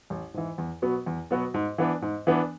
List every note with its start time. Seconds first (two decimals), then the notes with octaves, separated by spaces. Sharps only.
0.10 A1
0.34 G#2 E3
0.58 E2
0.82 B2 F#3 B3 F#4
1.06 E2
1.31 B2 F#3 B3 F#4
1.54 G#2
1.78 E3 B3 D4
2.02 G#2
2.27 E3 B3 D4